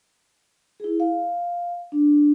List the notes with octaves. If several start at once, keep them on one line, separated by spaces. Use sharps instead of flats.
E4 G#4
F5
D4